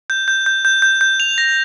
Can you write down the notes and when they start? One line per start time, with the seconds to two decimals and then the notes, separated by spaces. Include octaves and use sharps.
0.10 G6
0.28 G6
0.46 G6
0.65 G6
0.82 G6
1.01 G6
1.20 F7
1.38 A#6